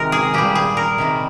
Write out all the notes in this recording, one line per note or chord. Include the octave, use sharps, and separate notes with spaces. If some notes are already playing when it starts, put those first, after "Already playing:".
Already playing: C3 D#3 G#3 A#4
G#4
A#2 G3 G4
G#4
A#4
C3 D#3 G3